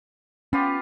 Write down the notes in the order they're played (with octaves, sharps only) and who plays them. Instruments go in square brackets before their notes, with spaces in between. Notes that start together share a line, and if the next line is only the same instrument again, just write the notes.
[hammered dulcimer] B3 F4 G4 [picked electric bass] C#4